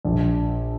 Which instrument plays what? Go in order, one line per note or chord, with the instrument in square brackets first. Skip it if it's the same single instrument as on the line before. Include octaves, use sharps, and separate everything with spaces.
[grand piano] A#1